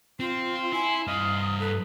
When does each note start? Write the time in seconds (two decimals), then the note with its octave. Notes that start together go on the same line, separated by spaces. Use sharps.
0.20 C4 F4 C6
0.73 E4 G#5
1.07 G2 D#5 F5 D#6
1.60 A4 B4